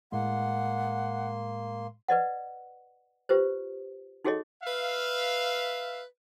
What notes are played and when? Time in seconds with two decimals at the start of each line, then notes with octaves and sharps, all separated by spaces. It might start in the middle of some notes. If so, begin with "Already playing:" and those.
0.12 A2 G#3 A#3 F#5 C6
2.08 B4 D5 D#5 F#5
3.29 F4 G4 B4 C5
4.25 D#4 F#4 G#4 A4 C#5 D#5
4.64 B4 E5 F5